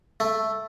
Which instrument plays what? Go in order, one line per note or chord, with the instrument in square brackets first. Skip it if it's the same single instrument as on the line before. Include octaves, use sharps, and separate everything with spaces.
[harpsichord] A3